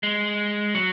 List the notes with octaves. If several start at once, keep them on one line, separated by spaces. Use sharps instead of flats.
G#3
F#3